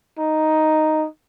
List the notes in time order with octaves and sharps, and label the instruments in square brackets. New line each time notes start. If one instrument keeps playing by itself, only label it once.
[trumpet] D#4